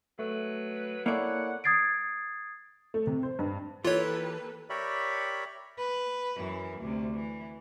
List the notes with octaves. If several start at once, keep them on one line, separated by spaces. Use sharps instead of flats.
F#3 A3 B4
A#3 E4 A4 C#5 D5 F#5
D#6 G#6 A6 C7 D7
A3
C3
C5
G2
E3 A#3 F4 G4 A4 B4 C#5
G4 A#4 C#5 D5 E5 B5
B4
F#2 E3
D2 C3
E3